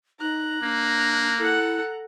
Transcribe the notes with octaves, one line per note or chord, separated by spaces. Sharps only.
D#4 A#5 F#6
A#3 D4
E4 A4 F#5